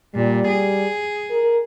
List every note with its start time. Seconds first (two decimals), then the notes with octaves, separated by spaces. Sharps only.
0.15 A#2 G3
0.48 G#4
1.31 A#4